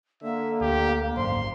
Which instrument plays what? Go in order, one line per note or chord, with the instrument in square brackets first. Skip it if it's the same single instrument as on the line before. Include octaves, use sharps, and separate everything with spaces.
[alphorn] D3 [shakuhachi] A#3 [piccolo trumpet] E5
[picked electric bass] D2 [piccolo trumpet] G4
[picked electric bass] G#1 F#2 [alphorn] C5 [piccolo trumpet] C6